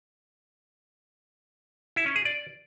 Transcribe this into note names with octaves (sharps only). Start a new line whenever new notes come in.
E4
C#4
G#4
D5